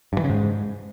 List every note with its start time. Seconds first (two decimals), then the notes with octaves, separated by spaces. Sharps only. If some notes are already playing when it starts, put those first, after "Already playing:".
0.13 G2
0.18 E3
0.24 C#3
0.30 G#2